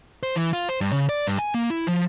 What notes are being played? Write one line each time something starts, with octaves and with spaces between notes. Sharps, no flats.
C5
E3
F4
C5
G2
C#3
D5
G2
G#5
A#3
E4
F3